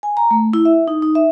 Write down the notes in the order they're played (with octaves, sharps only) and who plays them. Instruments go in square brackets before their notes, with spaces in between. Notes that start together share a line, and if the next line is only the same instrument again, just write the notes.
[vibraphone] G#5
A#5
A3
E4
E5
D#4
D#4
E5